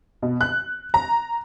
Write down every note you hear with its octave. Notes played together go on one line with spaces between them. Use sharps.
B2
F#6
A#5